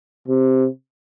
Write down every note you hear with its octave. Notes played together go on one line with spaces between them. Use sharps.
C3